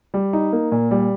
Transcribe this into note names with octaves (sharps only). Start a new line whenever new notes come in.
G3
D#4
A#3
A#2
G3